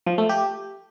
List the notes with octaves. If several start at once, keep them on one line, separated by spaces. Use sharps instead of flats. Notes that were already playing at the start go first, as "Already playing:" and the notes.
F3
A3
G4